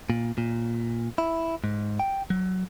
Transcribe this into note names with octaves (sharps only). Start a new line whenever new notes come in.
A#2
A#2
E4
G#2
G5
F#3